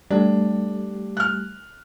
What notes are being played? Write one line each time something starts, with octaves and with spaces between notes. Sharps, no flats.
G3 A3 D4 G4
F6 F#6